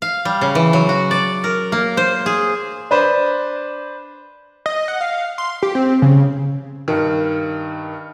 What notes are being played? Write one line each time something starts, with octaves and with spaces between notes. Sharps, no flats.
F5
G3
C#3
E3
F#3
F#4
D5
A#4
A#3
C5
G#4
D4 B4 C5 D5
D#5
F#5
F5
C6
G4
C4
C#3
G2 D#3